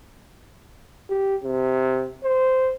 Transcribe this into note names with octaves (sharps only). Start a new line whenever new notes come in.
G4
C3
C5